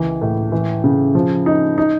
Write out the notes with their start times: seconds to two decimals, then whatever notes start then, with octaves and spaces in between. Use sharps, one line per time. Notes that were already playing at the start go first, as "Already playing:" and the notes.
Already playing: C#2 E3
0.21 A2
0.52 E3
0.84 C#3
1.15 F3
1.46 D#4
1.78 D#4